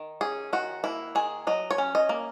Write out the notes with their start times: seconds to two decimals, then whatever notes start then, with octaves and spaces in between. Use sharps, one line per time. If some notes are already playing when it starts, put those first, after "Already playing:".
Already playing: D#3
0.21 C#4 G#4
0.53 D#3 F#4
0.84 A#3 E4
1.15 D#3 G#4
1.47 F#3 D#5
1.71 C#5
1.78 C#4
1.95 D#5
2.09 A#3